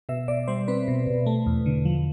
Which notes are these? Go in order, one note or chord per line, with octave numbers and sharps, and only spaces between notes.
B2 E5
B2 D5
G3 C5
C4 B4
B2
B2
A3
E2
D3
F3